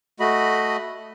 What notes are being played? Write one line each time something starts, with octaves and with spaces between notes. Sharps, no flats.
A3 F#4 D#5 B5